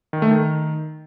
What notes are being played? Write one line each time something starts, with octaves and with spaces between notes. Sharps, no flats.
D#3
A3
D#3